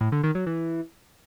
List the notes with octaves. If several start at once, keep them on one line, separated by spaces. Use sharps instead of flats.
A2
D3
D#3
F#3
E3